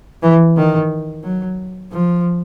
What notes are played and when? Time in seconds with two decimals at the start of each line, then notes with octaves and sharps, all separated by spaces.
0.22 E3
0.56 D#3
1.23 F#3
1.92 F3